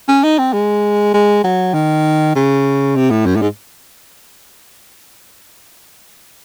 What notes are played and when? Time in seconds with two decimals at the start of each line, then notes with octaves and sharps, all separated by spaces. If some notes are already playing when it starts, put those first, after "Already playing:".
0.08 C#4
0.24 D#4
0.39 C4
0.53 G#3
1.14 G#3
1.44 F#3
1.74 D#3
2.36 C#3
2.96 C3
3.11 A2
3.26 F#2
3.36 A2
3.42 G#2